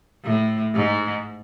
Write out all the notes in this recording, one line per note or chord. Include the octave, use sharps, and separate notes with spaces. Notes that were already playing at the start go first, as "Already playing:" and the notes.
A2
G#2